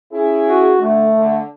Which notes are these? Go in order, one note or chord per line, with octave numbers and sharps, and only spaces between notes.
C#4 E4 G#4
F#4
D3 A3
D3